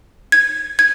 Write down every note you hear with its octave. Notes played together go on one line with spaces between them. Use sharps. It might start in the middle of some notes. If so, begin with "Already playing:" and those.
G#6
G#6